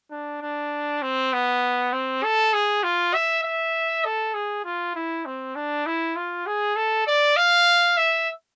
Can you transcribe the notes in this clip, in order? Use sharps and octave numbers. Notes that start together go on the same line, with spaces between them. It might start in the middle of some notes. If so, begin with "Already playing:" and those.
D4
D4
C4
B3
C4
A4
G#4
F4
E5
E5
A4
G#4
F4
E4
C4
D4
E4
F4
G#4
A4
D5
F5
E5